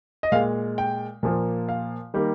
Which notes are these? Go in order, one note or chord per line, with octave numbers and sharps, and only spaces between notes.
D#5
A#2 G#3 F5
G5
A#2 F3 A#3
F5
D#3 G3 A#3